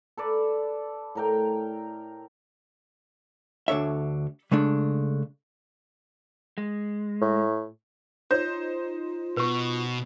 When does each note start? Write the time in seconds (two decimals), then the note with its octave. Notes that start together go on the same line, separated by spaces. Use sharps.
0.17 A4 B4 D5
1.15 A2 A#4 G5
3.68 D2 D4 A4 C#5 E5
4.52 C#3 G#3 A3 D4
6.58 G#3
7.21 A2
8.31 D#4 F4 C5 C#5
9.37 B2 B4 C#6